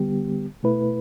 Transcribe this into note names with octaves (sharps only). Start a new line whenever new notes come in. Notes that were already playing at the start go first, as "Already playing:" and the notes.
Already playing: D3 G3 B3 G4
B2 A3 E4 B4